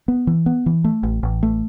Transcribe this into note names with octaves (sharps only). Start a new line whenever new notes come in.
B3
E3
B3
E3
A3
A1
A1
A3